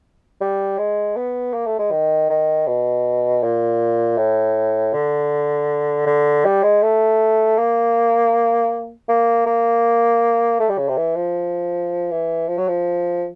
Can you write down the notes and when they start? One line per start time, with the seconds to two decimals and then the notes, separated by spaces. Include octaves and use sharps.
0.41 G3
0.78 G#3
1.16 B3
1.53 A#3
1.66 A3
1.79 G#3
1.91 D#3
2.30 D#3
2.67 B2
3.43 A#2
4.17 A2
4.93 D3
6.06 D3
6.45 G3
6.63 G#3
6.82 A3
7.58 A#3
9.09 A#3
9.46 A#3
10.59 A3
10.69 G3
10.78 C#3
10.88 C3
10.97 E3
11.16 F3
12.11 E3
12.48 F3
12.58 F#3
12.68 F3